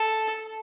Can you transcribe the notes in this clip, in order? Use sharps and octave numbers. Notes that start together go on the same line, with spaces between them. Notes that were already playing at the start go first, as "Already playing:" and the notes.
Already playing: A4